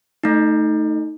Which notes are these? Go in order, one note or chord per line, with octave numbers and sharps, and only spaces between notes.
A3 D#4